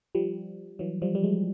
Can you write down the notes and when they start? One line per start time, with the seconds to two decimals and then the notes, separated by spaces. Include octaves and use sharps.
0.15 F3 G3
0.79 E3 F#3
1.02 F3 G3
1.15 G3
1.23 F#3 G#3